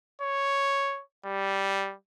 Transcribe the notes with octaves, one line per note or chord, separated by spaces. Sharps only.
C#5
G3